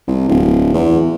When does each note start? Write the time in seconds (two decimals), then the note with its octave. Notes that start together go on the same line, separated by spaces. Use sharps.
0.08 C2
0.28 D1
0.74 E2